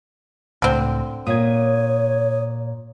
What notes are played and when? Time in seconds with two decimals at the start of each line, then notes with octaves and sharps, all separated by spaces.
0.62 C#2 A2 D3 C4
1.27 A#2 C#5 D#6 G#6